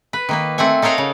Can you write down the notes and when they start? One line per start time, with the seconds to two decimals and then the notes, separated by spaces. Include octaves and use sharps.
0.13 B4
0.29 D#3 A#3 B4
0.58 A3 C4 F#5 G#5
0.82 D#4 A4 A#4 C#5 F5 F#5
0.98 C#3